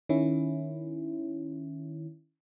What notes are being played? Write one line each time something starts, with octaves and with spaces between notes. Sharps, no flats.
D#3 C#4 E4